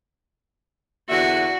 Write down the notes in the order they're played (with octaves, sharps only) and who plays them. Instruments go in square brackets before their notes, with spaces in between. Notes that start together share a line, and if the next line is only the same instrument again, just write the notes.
[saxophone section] E2 D3 E5 [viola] F#4